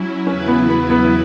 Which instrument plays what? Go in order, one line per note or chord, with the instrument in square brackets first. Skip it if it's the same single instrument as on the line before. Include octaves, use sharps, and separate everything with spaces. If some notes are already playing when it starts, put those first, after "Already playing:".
Already playing: [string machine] F#3 C#4 E4
[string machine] E2 C#3 F#3 E4 B4 [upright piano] C#4
[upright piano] B3
B3
B3